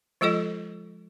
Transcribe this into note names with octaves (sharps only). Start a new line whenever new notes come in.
F3 G#3 F4 A4 D#5